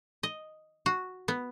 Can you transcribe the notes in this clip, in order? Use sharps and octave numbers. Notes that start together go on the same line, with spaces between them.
D#5
F#4
B3